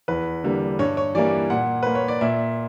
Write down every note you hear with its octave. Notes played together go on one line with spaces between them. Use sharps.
E2 B4
D3 G3 A#3
G2 C#5
C#5
E3 G3 A#3 D5
A#2 F#5
A#3 B4
C#5
D5
A#2 E5